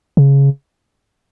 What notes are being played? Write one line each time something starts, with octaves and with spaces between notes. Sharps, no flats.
C#3